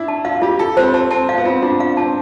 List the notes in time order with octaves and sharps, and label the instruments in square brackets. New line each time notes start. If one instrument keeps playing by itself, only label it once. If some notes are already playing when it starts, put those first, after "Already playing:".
Already playing: [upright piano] D4 E4
[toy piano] A5
[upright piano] F4 [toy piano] F5
[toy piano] F4 [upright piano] G4
[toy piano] F4 [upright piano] A4
[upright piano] C4 [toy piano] C5
[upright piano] C4 [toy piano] A5
[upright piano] C4 [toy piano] A5
[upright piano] F4 [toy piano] F5
[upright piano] B3
[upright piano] C4 [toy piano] F4
[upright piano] D4 [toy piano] F4
[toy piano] F5
[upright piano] C4 [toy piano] A5